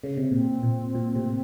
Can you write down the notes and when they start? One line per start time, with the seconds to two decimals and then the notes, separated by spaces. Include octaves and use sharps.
0.04 C#3
0.17 C3
0.32 A#2 C4
0.63 A#2
0.95 A#2
1.15 A2 C3